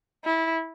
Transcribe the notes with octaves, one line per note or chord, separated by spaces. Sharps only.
E4